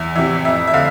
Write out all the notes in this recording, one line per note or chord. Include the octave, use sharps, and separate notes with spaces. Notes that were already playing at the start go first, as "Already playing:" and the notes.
Already playing: E2 E5
C3 E3 E5
F2 E5
E5
D3 F5